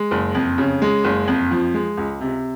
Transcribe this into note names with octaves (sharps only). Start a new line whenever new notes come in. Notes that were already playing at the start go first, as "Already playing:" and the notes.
Already playing: G#3
F#1
F2
C#3
G#3
F#1
F2
F3
G#3
C#2
C3